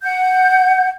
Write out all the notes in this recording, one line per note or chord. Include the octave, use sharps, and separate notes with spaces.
F#5 G6